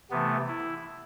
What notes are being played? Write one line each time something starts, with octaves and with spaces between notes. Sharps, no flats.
C3 E3 A3 B3
E4